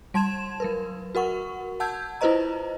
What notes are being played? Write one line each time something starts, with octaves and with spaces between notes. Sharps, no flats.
G3 A5 C6 G#6 E7
F#3 A#4 B4
F#4 A#4 F#5 C#6
F#5 A5 E6 G6 G#6
E4 F4 B4 C5 D#5 A#5